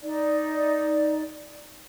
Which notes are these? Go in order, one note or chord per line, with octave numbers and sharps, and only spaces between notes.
D#4 D5